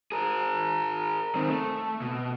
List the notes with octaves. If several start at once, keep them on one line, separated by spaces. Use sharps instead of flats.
G#4 A#4
D#3 C4
A3
B2